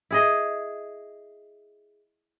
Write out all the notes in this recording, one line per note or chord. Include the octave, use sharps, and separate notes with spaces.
E4 G#4 D#5